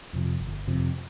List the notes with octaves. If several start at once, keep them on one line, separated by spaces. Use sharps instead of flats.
F2 C3 F3
G1
F2 C3 F3